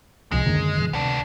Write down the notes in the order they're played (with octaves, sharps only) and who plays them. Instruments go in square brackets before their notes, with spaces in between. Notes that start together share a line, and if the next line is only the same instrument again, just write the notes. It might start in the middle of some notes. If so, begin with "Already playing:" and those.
[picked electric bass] D1 C2 F3 [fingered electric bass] B2 [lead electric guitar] G#3
[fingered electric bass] F#2 [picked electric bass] D3 D#3 A#3
[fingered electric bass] B2 E3 F3
[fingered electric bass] D2 C3 [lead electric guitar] B3 D4